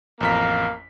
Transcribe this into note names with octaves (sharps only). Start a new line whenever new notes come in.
A1 F2 A#3 F5 A#5 B6